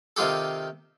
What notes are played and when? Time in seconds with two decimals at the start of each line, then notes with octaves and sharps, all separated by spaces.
0.16 C3 D#3 F4 G4 A4